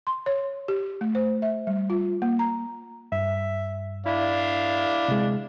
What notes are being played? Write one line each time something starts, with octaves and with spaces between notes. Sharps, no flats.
C6
C#5
G4
A3
C5
E5
G3
F4
A#3
A#5
G2 E5
D4 E4 F5
C3 G#3